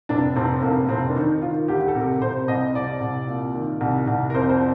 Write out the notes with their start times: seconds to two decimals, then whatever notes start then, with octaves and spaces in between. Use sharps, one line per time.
0.09 F1 D4
0.36 F1 C4
0.63 F1 A#3
0.89 F1 C4
1.09 D4
1.16 D#3 D#4
1.42 D#3 F4
1.68 D2 G4
1.88 A4
1.95 C3 A#4
2.22 C3 C5
2.48 C2 D#5
2.74 C2 D5
3.01 C2
3.28 A#2
3.54 D#3
3.81 C2
4.08 C2
4.30 A#4
4.34 F2 C5
4.49 C5